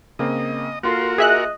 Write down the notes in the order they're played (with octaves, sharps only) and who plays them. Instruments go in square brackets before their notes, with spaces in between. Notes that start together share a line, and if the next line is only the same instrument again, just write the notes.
[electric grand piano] C#3 A#3 C4 [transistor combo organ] D#5
[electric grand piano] A#3 F4 A4 [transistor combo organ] F#4 A#4 [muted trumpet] C6
[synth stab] G#4 E5 F#6 [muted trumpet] D#5